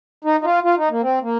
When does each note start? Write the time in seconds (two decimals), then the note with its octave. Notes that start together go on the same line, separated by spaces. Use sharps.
0.25 D#4
0.40 D#4
0.44 F4
0.64 F4
0.77 D#4
0.90 A#3
1.02 C4
1.22 A#3